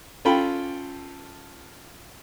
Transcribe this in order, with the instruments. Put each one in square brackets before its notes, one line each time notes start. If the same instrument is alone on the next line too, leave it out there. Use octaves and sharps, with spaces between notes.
[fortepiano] C#4 F4 A4 G5 B5